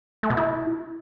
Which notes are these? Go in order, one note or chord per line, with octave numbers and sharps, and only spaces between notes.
A3
B2
E4